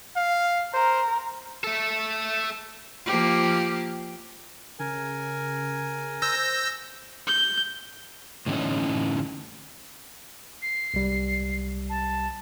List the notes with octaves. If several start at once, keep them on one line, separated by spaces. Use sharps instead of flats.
F5
A#4 C5
A3 A4
F3 A#3 G4
C#3 A#4 G#5
C5 E6 G6 A#6
G6
A2 D3 E3 G#3 C#4 D#4
C7
C2 G3
A5